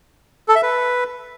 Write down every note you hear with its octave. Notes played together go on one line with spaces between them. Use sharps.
A4
E5
B4